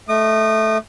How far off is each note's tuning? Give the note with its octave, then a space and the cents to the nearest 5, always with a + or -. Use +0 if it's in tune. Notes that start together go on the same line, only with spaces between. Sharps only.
A3 -5 D#5 +0 D#6 -35